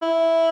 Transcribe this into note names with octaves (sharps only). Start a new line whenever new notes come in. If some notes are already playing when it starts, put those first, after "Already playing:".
E4